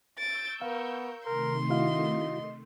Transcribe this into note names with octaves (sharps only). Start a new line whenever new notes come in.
C#6 E6 G6 A6 D7
B3 A#4 F5
C3 D#3 A3 A#4 C6
E4 F#4 D#5 F5